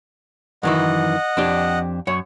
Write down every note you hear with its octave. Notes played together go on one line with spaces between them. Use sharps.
F#2 D#3 E3 D#5 F#5
F2 D4 G4
F#2 C#5